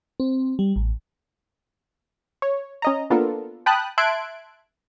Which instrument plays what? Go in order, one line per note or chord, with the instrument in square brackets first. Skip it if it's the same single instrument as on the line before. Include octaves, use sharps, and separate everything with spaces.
[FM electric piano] C4
G3
A1
[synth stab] C#5
C#4 D#5 A#5
A#3 B3 D4 F4 A4 A#4
G5 A5 B5 D#6 F#6
E5 A5 C6 F#6 G#6 D7